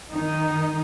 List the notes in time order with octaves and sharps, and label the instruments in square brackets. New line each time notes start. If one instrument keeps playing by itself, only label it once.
[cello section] D#3 D#4